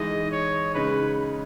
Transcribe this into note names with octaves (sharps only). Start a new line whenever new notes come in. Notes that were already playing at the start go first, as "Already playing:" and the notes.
Already playing: E3 G#3 D#4 D#5
C#5
C#3 G#3 D#4 B4